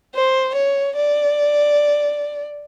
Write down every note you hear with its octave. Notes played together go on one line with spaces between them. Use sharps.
C5
C#5
D5